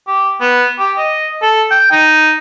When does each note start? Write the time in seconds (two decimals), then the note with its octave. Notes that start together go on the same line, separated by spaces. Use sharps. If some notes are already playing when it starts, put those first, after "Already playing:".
0.07 G4
0.41 B3
0.79 G4
0.98 D#5
1.42 A4
1.71 G5
1.92 D#4